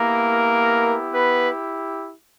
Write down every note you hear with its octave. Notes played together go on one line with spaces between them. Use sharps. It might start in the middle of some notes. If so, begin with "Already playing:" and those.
Already playing: A#3 B3 E4 G4 A#4
B3 B4